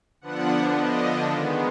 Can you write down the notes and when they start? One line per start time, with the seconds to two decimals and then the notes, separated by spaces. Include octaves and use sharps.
0.21 D3 F3 B3 D4 F#5
0.77 D#5
1.32 D#3 G#3 B3